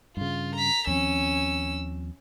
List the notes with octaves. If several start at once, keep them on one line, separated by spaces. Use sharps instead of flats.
G2 C#3 F4
A#5 B6
D#2 F3 C4 C#4 E6